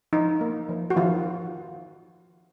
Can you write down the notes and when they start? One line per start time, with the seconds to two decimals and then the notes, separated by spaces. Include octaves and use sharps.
0.13 F3 D#4
0.41 A#3
0.69 F3
0.90 F#4
0.97 D#3 F3 F4